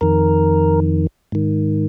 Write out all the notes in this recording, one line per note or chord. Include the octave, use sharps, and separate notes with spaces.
F2 D#3 A#4
G#2 D#3